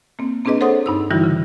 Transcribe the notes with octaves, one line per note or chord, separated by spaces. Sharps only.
A#3 C4
A#3 C4 D4 G#4 B4 D#5
A4 C5 C#5 F#5 C6 D#6
G2 D#4 E6
D3 E3 G3 D#4 E4 F#4
C#3